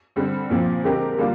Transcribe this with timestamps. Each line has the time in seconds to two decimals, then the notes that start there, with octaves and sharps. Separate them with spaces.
0.16 D3 G3 C4
0.50 A#2 F3 C4
0.84 D3 G#3 C4 G4 A#4
1.18 D3 G3 A#3 D4 F4